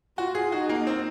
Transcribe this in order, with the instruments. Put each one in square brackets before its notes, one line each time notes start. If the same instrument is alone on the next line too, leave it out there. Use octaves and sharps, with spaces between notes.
[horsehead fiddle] F4 [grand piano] F#4
[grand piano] G#4
[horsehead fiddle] D#4 [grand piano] F#4
[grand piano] A#3
C4